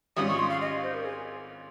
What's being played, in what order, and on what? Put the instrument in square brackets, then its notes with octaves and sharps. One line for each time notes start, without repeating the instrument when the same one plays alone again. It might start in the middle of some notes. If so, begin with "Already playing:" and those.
[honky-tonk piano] G#1 G#2 G3 C#4 F4 [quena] D#6
[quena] C#6
C6
F5
D#5
C5
A#4
G#4